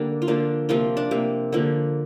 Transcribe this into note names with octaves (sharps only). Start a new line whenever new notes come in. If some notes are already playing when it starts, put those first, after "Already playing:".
Already playing: D3 G3 A#3 D4 A#4
F4
D3 F3 A#3 D4
C3 F3 A#3 F4
D4
C3 A#3
D3 F3 A#3